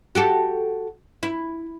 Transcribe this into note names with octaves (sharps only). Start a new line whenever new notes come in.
F#4 G4 A4
E4